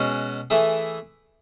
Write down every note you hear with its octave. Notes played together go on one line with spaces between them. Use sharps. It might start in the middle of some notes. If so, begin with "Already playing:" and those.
Already playing: B2 G#3 C#4 F#4
E3 A3 E4 G#4